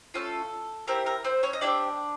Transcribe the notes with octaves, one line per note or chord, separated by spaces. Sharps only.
A3 C#4 F4 A4
C4 E4 G4 A#4
A#4
C4 C5
C#4 C#5
D#5
D4 E4 G4 D5
C4